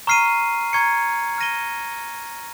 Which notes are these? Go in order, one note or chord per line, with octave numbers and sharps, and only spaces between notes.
A#5 C#6 F6 C7 D#7
A#5 C#6 G#6 C#7
F6 A#6 D#7 G7